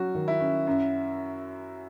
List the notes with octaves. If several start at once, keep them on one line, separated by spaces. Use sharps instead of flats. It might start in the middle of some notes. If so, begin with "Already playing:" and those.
Already playing: F#3 C#4 F#4
D#3
E4
C#4
F#2